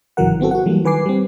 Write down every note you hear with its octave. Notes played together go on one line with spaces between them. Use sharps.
G#1 C#3 E3 F#3 A#4 F#5
D#3 B3 C4 F#4 A4
F#4 F#5
E3 F#3 G3 A#3
D#3 B4 G#5 D6 C7
G3 C4